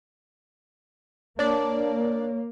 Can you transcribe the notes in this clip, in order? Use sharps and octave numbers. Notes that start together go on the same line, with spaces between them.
A#3 D4 C#5 D5